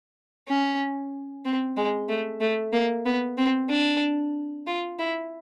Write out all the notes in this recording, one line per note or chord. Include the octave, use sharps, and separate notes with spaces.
C#4
C4
G#3
A3
A3
A#3
B3
C4
D4
F4
E4